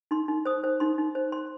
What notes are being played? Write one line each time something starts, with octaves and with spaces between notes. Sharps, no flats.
D#4 C6
D#4
C5 D#6
C5
D#4 C6
D#4
C5
C5 C6